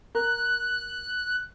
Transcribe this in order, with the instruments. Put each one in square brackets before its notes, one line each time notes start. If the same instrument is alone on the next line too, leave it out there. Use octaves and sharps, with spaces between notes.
[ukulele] A#4 [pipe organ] F#6